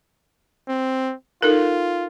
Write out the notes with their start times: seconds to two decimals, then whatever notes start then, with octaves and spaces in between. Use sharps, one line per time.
0.68 C4
1.42 D#4 F4 A4 A#4